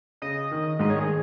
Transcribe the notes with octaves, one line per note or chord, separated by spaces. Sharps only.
C#3 D#5
D#3
G#2 G#3 D#5
C#5
D#3 G#4